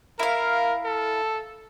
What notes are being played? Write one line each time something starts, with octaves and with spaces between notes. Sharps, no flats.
E4 A#4 F5
A4